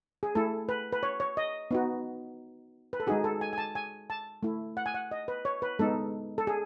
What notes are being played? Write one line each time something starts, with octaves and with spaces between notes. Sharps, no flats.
G#4
A3 E4 A4
B4
B4
C#5
C#5
D#5
B3 D#4 F#4
B4
A4
G#3 D#4 F#4 G#4
A4
G#5
G#5
A5
G#5
A5
A3 E4
F#5
G#5
F#5
D#5
B4
C#5
B4
G#3 B3 D#4 A4
A4
G#4